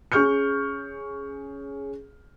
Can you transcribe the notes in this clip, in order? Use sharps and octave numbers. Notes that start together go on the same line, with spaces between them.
C#4 G#4 C#6 F6 G6 C#7